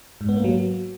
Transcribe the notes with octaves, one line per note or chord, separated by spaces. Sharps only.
G#2
B3
A#3
F#3